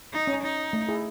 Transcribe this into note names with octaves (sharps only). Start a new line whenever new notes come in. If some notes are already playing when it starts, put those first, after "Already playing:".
D#4
C#4
D#4
A3
E4 G#4